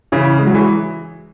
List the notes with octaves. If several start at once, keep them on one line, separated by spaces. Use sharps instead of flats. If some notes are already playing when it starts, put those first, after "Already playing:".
C#3 E3
G#3
F#3
E3 G#3